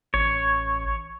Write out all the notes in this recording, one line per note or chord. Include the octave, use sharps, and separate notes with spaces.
A1 C#5